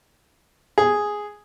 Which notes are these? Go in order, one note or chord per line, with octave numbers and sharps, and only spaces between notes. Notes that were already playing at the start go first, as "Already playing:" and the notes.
G#4